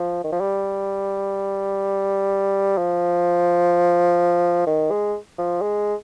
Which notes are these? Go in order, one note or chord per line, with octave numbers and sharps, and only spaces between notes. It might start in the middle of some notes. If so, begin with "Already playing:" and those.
Already playing: F3
D#3
F3
G3
F3
D#3
G#3
F3
G#3